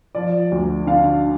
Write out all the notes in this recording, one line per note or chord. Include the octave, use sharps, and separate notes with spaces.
F3 D5
D2
D3 F5